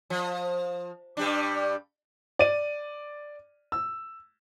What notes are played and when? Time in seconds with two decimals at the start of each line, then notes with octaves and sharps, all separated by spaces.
0.10 F3
1.17 G2 G3 D4
2.39 D5 D#7
3.72 E6